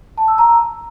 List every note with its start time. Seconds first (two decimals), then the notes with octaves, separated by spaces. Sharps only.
0.18 A5
0.28 E6
0.38 A#5